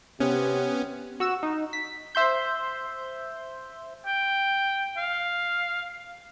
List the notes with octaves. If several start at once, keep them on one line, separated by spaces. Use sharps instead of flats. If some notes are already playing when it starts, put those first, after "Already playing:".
C3 B3 C#4
F#4 E6 E7
D#4
B6
C5 E5 C6 G6
G5
F5